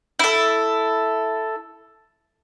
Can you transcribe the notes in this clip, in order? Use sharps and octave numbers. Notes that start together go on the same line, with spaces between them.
E4 A4